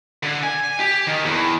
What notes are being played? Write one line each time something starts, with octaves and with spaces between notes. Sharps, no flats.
D3
G#5
G4
D#3
E2